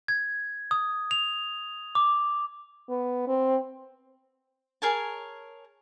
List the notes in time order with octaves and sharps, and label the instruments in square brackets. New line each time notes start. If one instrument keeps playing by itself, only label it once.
[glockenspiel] G#6
D#6
F7
D6
[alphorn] B3
C4
[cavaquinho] G#4 A#4 C#5 A5